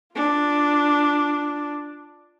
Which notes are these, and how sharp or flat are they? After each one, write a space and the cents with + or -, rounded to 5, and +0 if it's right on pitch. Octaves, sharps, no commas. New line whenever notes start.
D4 +0 F4 +0